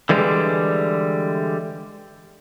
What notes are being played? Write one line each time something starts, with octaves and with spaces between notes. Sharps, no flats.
D3 E3 G3 G#3